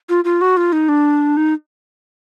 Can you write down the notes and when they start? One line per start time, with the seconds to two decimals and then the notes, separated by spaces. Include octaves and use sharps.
0.09 F4
0.25 F4
0.41 F#4
0.57 F4
0.72 D#4
0.89 D4
1.37 D#4